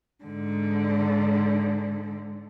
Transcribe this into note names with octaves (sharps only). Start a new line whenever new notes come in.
G#2 D3